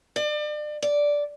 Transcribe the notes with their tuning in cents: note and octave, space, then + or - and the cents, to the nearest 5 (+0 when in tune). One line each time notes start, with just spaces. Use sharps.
D5 +35
D5 -5